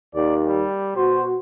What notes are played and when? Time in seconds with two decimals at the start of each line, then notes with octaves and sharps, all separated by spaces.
0.15 D#2 D5
0.45 G3
0.96 B2 F#4 C5